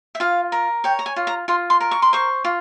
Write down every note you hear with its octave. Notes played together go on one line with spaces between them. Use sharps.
E5
F4 F5
A#4
C#5 G5
A#5
G#5
F4
A#5
F4 C6
C6
A#4
C#6
C6
C5 C#6
F4